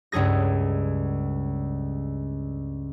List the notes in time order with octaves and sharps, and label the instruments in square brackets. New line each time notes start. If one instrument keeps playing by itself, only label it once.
[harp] C#2 G2 A3 G#4 A#6